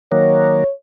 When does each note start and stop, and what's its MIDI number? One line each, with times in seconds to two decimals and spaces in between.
0.12 0.64 51
0.12 0.64 54
0.12 0.64 58
0.12 0.71 73